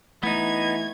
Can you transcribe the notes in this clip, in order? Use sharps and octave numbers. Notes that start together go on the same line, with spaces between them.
E3 A3 B3 D#4 G#6